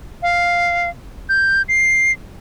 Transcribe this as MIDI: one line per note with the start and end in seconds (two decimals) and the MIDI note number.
0.22 0.89 77
1.29 1.62 91
1.69 2.12 96